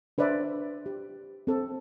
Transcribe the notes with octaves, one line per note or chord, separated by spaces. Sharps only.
D4 B4 C5 D5 E5
G4
C4 A4